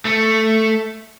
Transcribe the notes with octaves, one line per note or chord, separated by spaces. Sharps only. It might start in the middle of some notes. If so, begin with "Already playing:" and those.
A3